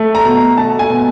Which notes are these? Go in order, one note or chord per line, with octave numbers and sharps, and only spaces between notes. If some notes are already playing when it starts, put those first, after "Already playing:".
Already playing: A3
A#5
B2
A3 A5
G#5
B2